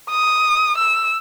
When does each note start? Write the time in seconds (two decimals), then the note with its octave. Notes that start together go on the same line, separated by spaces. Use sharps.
0.10 D#6
0.78 E6